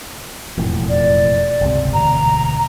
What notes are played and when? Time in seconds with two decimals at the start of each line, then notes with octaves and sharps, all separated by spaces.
0.58 E1 F2 A2
0.89 D5
1.61 G1 C#2 C3
1.94 E1 D2 A#5